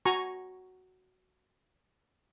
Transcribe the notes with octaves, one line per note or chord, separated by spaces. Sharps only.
F#4 G#5 A#5 C#6